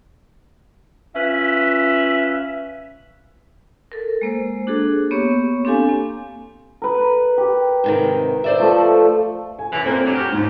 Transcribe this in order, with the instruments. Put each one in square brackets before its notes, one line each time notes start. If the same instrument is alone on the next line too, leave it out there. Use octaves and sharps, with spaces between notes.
[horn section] C#4 F4 B4 E5
[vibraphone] A4 A#4
G#3 A#3 C5
D4 F#4 G#4 A4
A#3 B3 G4 C#5 C#6
C4 D4 G4 A4 F5 G#5
A#3 G#5
[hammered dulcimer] A#4 B4
G4
[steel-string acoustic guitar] G#2 C3 D#3
C5 D5 E5
[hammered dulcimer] F3 A3
[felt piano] G#5
[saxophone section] F#2 E3 [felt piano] G#5
[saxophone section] A#2 A#3 [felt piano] A3 C4
[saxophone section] G2 F#3
[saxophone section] F#4 G4 [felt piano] F6
[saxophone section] D#2 [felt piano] G#2